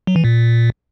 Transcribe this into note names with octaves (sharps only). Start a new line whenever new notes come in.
F#3
E3
A#2